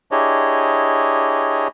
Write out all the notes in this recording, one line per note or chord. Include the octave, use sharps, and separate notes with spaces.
D4 E4 G4 G#4 C#5 D#5